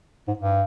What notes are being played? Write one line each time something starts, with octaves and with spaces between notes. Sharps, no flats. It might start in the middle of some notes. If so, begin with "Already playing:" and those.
G#2
G2